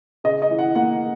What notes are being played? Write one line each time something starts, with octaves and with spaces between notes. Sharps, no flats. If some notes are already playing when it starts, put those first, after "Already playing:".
C#3 D#5
D#5
E3
F#5
A#3 F#5